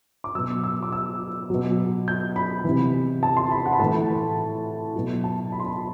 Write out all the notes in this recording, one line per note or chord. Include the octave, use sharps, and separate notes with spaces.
D6
B2 F#3 E6
E6
D6
E6
B2 F#3
G6
B5
C3 E3
A5
C6
B5
F#5
B5
A2 E3 A5
B2 F#3
A5
B5
C6
B5